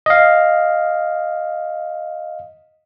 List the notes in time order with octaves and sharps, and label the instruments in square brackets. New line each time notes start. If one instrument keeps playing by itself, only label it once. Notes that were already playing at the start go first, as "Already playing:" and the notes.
[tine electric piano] D#5 F5